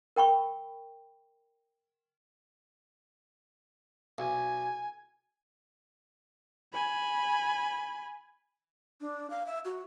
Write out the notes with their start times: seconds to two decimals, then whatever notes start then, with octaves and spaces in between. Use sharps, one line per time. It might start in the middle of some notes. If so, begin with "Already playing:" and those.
0.16 A#4 G5 B5 C#6
4.18 B1 G#5
6.73 G#5 B5
9.01 D4
9.30 F5
9.46 E5
9.65 F#4